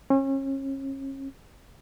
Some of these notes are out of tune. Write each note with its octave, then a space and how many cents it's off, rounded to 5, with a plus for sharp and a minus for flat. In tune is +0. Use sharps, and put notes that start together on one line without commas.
C#4 -35